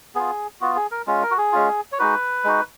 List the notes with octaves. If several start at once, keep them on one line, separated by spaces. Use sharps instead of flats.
B3 F4 G#4
B3 F4 F#4
G#4
A#4
G#3 C#4 F4
A#4
F#4
G#4
G#3 C#4 F4
C#5
G#3 D#4 F#4 B4
G#3 D#4 F#4